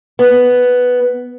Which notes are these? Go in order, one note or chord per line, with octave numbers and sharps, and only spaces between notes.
B3